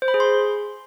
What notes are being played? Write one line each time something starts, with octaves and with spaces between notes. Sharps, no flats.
C5
B5
G#4
C6